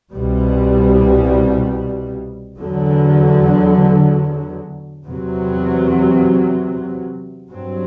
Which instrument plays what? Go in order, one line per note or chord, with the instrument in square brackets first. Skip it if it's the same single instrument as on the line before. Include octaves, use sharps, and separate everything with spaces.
[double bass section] C2 B2 G3
E2 D3 F#3
E2 C3 F#3
G2 F#3 C4